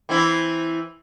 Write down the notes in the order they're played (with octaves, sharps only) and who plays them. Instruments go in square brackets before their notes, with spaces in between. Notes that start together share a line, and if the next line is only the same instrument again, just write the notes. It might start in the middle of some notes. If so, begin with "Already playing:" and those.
[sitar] E3 C4 E4